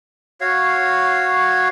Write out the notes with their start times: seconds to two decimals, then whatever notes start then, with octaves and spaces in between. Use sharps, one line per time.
0.41 F#4 C#5 F5